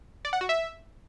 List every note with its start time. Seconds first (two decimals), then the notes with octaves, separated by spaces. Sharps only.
0.25 D5
0.33 F#5
0.41 F#4
0.49 E5